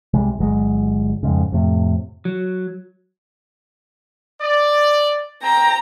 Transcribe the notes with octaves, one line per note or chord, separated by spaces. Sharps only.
C2 C3 G3 G#3
G1 F#3 G#3
F2 G#2 C#3
F2 A2 C3
F#3
D5
C4 G5 A#5